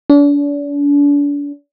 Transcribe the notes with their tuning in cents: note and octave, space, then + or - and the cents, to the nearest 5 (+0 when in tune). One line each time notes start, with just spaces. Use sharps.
D4 -40